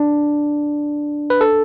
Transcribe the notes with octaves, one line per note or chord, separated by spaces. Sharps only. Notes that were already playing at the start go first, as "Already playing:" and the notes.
Already playing: D4
B4
A4